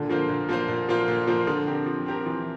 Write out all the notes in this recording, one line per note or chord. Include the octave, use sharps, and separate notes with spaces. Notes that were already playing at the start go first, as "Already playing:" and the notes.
Already playing: A#2 D3
F3 A#3 F4 C5
A#2
F3 A#3 F4 C5
A#2
F3 A#3 F4 C5
A#2
F3 A#3 F4 C5
D3 F3
C4 G4 A#4
F3
C4 G4 A#4
E3 F3